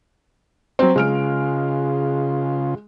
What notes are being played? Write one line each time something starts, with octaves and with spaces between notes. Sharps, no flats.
F#3 C4
C#3 G#3 F4 F6 D7